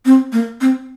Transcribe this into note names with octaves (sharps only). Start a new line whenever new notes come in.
C4
A#3
C4